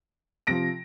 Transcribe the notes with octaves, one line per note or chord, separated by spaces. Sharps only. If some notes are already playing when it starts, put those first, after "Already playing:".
C3 F3 A#6 D7